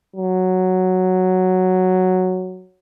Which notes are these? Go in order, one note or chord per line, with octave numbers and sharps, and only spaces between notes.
F#3